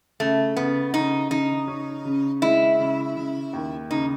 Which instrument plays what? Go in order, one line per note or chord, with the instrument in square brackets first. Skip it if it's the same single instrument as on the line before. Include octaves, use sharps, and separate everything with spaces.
[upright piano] C#3 [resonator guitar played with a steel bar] A3
[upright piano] C#3 [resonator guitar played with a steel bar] B3
[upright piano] C#3 [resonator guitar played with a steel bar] D#4
[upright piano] C#3 [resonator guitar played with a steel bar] D#4
[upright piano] C#4
C#3
[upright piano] G#3 [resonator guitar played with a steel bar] E4
[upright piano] C#3
C#3
D#2
[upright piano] C#3 [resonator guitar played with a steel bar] D#4